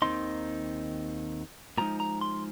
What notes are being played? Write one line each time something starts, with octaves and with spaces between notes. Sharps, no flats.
D#2 D#3 C4 D#4 C6
A#2 F3 G#3 D#4 A#5
A#5
C6